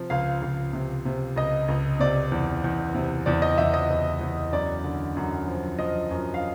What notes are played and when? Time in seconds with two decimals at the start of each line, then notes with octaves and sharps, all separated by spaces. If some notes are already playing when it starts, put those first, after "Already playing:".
Already playing: C3 F3
0.10 C#2 F5
0.42 C#2
0.73 C3
1.05 C3
1.36 C#2 D#5
1.68 C#2
2.00 C3 D5
2.32 E2
2.64 E2
2.94 C3
3.26 E2 D5
3.42 D#5
3.58 E2 E5
3.74 D#5
3.90 E2
4.21 E2
4.52 F#2 D5
4.84 D3
5.17 F#2
5.48 F3
5.79 F3 D#5
6.11 F#2
6.34 F5